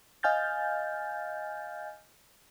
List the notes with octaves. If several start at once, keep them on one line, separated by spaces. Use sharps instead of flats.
D#5 F5 G#5 F6 G6 A6